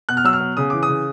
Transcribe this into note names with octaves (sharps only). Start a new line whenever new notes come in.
B2 F#6
F6
F#3 E6
F6
B2
C#3 D#6
E3 D6
D#6
C#3